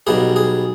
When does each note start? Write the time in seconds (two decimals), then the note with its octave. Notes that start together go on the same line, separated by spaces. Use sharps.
0.07 B1 B2 G3 G#4
0.36 G#4